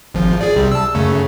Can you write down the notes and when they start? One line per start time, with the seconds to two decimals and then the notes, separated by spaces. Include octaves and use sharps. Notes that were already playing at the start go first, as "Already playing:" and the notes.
0.14 G#1 F3
0.41 G#4 D5
0.56 C2 C3 G3
0.72 A5 E6
0.95 F#2 C#3 A3